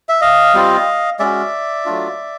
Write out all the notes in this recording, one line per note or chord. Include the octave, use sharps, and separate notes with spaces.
E5
D#5 F5
G3 C4 F4
G#3 C#4 F#4 D5 E5
F#3 A3 D4 F4